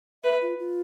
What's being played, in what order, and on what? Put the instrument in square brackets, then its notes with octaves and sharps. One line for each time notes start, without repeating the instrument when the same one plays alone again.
[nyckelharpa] B4 [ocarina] E5
[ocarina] F4
F4